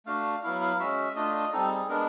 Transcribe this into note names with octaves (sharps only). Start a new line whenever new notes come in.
A3 D4 F#4 F5
F#3 B3 E4 F5
F5
G#3 C#4 F#4 E5
A3 D4 F4 D#5
D#5
G3 C4 D#4 A4
G#4
G#3 B3 D4 A#4